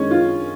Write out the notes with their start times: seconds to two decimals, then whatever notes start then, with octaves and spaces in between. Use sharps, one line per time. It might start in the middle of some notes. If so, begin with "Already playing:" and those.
Already playing: F#2 D#3 G#3 C#4
0.11 F4